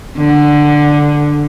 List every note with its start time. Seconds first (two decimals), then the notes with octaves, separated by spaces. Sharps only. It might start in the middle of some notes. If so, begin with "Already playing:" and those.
0.18 D3